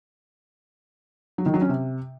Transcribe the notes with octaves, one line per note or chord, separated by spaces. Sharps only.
F#3
D#3
F#3
C#4
C3